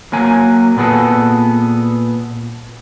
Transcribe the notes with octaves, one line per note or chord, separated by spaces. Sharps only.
F#3 A#3 G#5
A#2 B3 G#4 A4